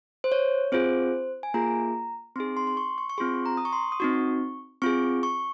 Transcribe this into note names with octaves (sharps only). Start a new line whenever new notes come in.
C5
C#5
C4 F4 G#4 C5
G#5
A#3 F4 G#4 A#5
C4 D#4 G#4 C6
C6
C6
C#6
C#6
C#6
C4 F4 G#4 C6
A#5
D#6
C#6
C6
D#6
C4 D#4 F#4 C#6
C4 F4 G#4 C#6
C#6